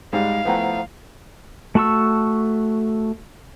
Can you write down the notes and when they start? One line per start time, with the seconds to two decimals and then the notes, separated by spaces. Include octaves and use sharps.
0.13 G#2 G3 G#3 F5
0.45 F3 A3 B3 E4 C5 F#5 G5 A#5
1.75 A3 F#4 A5 C#6 E6